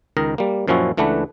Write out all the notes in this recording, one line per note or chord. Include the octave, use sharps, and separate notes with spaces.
C#2 D#3 A#4 D#5
G3 A#3
F#2 A#2 F3 C#4 E4 F#4
C#2 E3 A3 D4 B4 F#5